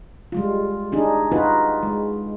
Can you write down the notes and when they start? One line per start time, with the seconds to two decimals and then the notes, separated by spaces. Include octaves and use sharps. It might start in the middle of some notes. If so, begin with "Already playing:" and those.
0.32 G3 G#3 F4
0.92 D4 D#4 G#4
1.32 D#4 F4 F#4 B4
1.83 G#3